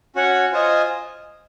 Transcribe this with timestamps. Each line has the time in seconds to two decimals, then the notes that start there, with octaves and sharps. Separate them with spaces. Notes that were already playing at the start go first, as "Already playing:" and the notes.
0.16 C#4 F#4 C#5 F#5
0.52 F4 C5 D#5 G#5